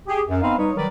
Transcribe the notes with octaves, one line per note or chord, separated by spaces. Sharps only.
G4 G#4
F#2
B3 C4 D#4 B4 F5
G3 D#4 B4 C#5
D#3 F#3 G3 A#4 B4 D5